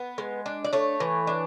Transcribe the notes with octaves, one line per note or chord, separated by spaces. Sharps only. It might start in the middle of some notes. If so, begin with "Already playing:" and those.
Already playing: B3
G#3
D4
D5
A3 C#5
E3
D4